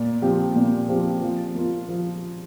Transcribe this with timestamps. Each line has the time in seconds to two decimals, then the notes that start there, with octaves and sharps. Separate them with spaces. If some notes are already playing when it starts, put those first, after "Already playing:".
Already playing: A#2
0.22 F3 C4 G4
0.56 A#2
0.89 F3 C4 G4
1.22 F3
1.55 A#3 F4
1.89 F3